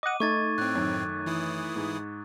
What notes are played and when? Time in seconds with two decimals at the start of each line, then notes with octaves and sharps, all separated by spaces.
0.03 D#5 F#5 D6 D#7
0.20 A3 D#4 C#6 G#6 A6
0.58 A2 C4 F#6
0.75 F#2 D#3
1.26 E3 E4 D#6
1.76 G#2